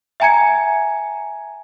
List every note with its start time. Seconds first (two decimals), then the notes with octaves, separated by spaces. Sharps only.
0.20 E5 G5 G#5 A#5 G#6 C#7